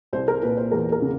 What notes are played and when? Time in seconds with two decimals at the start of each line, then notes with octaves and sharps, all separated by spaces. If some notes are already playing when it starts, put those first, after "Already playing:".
0.13 C2 C5
0.28 A#4
0.42 A#2 B4
0.57 C5
0.71 E2 A#4
0.92 A#4
1.02 C#3